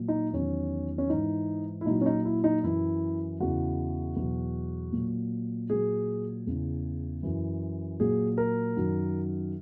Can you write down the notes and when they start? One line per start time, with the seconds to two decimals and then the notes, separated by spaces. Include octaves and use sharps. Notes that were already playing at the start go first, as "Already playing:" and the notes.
Already playing: A#2 F#3
0.08 D#4
0.33 E2 D#3 F#3 C#4
0.98 C#4
1.10 G#2 E3 D#4
1.81 E4
1.86 A#2 F#3 D#4
2.01 C#4
2.06 D#4
2.25 E4
2.44 D#4
2.63 F#2 E3 E4
3.40 E2 C#3 E3 F#4
4.16 E2 B2 F#3
4.93 A#2 F#3
5.70 A#2 F#3 G#4
6.47 E2 C#3 E3
7.23 F#2 E3
8.00 A#2 F#3 G#4
8.38 A#4
8.77 F#2 D#3 F#3